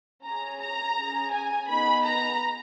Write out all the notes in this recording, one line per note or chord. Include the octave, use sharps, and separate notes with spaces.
C#4 G#4 A#5
A#5
C#4 G#4
G#5
B3 D#4 G#4 B5
A#5